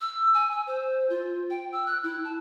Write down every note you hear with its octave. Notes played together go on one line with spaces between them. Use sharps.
E6
G#5
E6
C5
F4
G5
E6
F#6
E4
A5